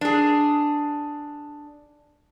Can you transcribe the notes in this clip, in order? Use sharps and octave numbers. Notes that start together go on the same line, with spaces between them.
D4 G#4